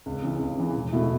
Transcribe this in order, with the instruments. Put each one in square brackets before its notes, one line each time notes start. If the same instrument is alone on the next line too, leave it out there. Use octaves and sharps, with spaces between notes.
[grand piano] C#2
C#3 E3
C#2
C#3 E3
E1
B2 A3 E4